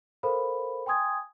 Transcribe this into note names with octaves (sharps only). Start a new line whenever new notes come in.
A4 A#4 C5 F5 B5
G5 G#5 C6 D#6 G#6